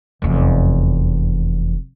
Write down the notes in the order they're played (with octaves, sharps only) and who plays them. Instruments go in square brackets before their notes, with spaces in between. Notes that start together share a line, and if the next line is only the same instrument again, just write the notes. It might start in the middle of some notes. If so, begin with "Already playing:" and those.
[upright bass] F1 E2